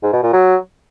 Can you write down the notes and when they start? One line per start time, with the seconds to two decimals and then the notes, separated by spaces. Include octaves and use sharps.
0.03 G#2
0.13 B2
0.23 A#2
0.33 F#3